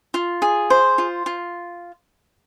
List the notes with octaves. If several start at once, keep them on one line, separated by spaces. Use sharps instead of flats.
F4
G#4
C5
F4
F4